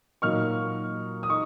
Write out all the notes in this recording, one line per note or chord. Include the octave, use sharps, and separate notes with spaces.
A#2 F#3 A#3 D#4 C#6 F6
D#6
D#4 C#6